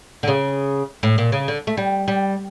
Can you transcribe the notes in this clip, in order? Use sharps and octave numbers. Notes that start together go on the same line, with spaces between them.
D3
C#3
A2
A#2
C#3
D3
A3
G3
G3